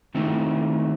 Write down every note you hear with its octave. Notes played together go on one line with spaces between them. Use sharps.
D#3 A3 C4 E4